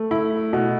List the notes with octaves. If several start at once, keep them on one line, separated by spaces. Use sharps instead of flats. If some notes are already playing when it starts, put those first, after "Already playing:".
Already playing: A3
E4
B2